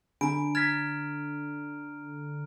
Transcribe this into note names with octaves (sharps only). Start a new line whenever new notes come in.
D3 D4 A#5 B5 D7
A#5 F6 G#6 A6 B6